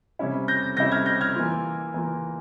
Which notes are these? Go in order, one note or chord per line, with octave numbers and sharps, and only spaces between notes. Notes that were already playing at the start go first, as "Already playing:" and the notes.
C3 G3 C#4 E4
G6 A#6
C3 G3 C#4 E4 G6 A#6
F6 G#6
G6 A#6
F6 G#6
E3 A#3 F4
E3 A#3 F4